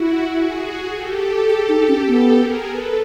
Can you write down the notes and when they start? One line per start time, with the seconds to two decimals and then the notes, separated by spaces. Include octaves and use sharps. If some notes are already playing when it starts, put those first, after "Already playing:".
Already playing: E4 F#4
0.34 F#4 G#4
0.92 G4 A4
1.50 G#4
1.69 D#4
1.88 C#4
2.07 B3 G4 A4
2.35 G#4 A#4
2.64 A4 B4